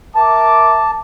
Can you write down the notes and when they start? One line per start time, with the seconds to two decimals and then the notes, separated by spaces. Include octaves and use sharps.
0.15 A#4 E5 A5 D6